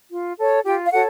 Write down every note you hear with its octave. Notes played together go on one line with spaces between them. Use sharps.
F4
A4 C#5
F4 G4 G5
F5
F#4 A4 C#5 F#5